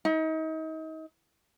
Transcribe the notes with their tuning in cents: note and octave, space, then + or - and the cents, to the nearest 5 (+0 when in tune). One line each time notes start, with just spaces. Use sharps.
D#4 +35